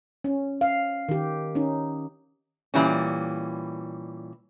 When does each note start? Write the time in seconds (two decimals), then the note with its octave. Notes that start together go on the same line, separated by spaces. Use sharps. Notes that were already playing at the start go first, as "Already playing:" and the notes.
0.24 C#4
0.61 F5
1.09 D#3 G4
1.55 C#4 D#4
2.74 A#2 E3 G3 C#4